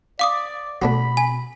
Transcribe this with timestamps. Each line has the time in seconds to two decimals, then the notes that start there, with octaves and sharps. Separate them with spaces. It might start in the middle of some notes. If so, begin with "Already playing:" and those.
0.19 D5 F5 D6 D#6
0.82 B2 A3 C4 D4 F#4 B5
1.17 G#5